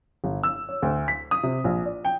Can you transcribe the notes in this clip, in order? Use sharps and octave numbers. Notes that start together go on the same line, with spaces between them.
G1
E6
C#5
D2
B6
D#6
C3
A#1
D5
G5